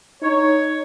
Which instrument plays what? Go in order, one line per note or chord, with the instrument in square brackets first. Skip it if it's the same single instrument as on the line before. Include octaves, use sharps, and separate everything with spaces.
[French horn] D#4 [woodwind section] C#5